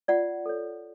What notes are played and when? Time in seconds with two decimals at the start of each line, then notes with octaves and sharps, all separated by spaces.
0.08 F4 D5 F#5
0.46 A4 C#5